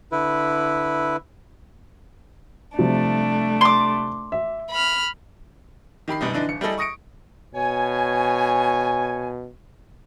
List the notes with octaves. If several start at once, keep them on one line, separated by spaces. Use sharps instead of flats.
D3 E4 B4
C3 F3 G3 A3 D4
C6 D6
E5
B5 F6
D#3 G4 B5 C7
F#2 B2 G3 D#4
D3 E3 D4 D#4
D1 C#7
G3 E4 G#4 A4 D#5
C#6 D#6 A#6 C#7 D7
B2 C#5 G#5